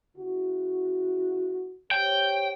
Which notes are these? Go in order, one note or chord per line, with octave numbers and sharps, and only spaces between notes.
C#3 E4 F#4
G4 C5 C#5 G5